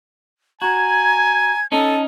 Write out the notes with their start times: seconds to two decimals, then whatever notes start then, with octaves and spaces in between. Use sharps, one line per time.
0.62 F#4 G#5 A#5 G#6
1.72 C#4 D#4 A4 A5